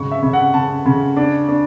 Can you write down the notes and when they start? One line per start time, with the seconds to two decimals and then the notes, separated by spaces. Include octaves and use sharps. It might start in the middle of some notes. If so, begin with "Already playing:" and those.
Already playing: G#2 C#3 F#3 C#6
0.12 E5
0.23 C#3
0.33 F#5
0.54 C#3 A5
0.86 C#3
1.17 D4
1.49 D4